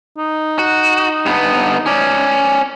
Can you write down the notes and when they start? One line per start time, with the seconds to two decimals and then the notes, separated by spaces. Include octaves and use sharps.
0.18 D#4
0.59 F#4
1.26 G2 B3
1.86 C#4 D5